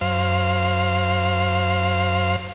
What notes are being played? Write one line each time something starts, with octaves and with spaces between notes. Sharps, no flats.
F#2 C5 F5